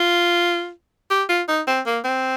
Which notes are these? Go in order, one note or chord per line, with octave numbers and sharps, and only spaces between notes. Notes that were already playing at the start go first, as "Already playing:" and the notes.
Already playing: F4
G4
F4
D#4
C4
A#3
C4